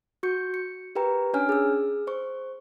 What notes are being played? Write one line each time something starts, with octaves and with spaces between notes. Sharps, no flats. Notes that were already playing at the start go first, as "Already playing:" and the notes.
F#4 C#6 G6 C#7
C#7
G4 A#4 B4 G5 A#5
C#4 D4 C#5 G#5 F6
G#4 E6
C5 C#6